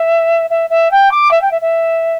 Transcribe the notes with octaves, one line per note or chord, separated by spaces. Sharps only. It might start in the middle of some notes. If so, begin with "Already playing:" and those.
Already playing: E5
E5
E5
G5
D6
E5
G5
E5
E5